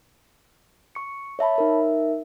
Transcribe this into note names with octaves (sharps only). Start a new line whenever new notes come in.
C#6 C#7
C#5 E5 A5 B5
D#4 A#4 E5